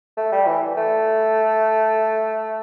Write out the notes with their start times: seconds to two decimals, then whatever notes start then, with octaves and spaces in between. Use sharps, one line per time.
0.17 A3
0.32 G3
0.47 E3
0.77 A3